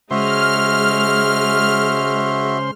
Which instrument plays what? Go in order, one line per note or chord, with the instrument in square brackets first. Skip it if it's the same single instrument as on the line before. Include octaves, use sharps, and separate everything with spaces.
[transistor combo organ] C#3 C5 C6 [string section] G#3 [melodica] F#4 E5 [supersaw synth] F6